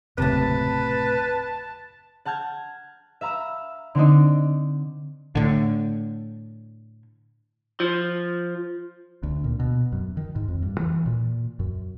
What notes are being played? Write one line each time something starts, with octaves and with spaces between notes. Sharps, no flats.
F#1 D#2 A2 C3 B4 A5
F#5 A5 F6 G6 G#6
E5 F5 A#5 B5 E6
D3 C4 D4 D#4
A2 D3
F3
D2
A#2
B2
F#2
D#3
G#2
F2
G2
E3
A#2
F#2